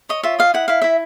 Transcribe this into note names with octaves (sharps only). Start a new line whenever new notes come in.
C#5 D#5
F4 E5
D#5 F5
E4 F#5
E4 F5
E4 E5